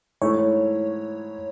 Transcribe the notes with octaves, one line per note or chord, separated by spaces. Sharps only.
G#2 E3 A3 E4 C#5